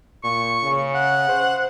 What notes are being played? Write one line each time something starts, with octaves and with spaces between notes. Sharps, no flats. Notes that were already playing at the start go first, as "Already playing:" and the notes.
A#2 C#6
C#3
F#5
C5